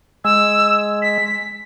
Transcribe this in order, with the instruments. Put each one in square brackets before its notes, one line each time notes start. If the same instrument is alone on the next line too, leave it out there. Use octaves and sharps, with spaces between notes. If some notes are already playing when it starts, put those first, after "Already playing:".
[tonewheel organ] G#3 [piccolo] E6
[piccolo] B6